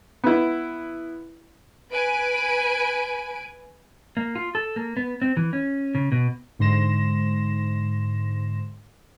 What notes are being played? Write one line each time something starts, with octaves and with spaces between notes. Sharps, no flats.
B3 E4
B4 G#5 D7
A#3
F4
A4
A#3
B3
C4
E3
C#4
C#3
B2
G#2 D3 C5 C6 A#6 E7